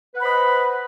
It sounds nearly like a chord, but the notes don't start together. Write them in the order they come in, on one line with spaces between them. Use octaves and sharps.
B4 F#5 B5 C5 D#5